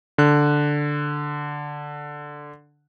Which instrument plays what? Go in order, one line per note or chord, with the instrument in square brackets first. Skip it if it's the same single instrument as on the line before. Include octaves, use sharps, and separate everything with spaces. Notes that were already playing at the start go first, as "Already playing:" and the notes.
[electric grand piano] D3 F#6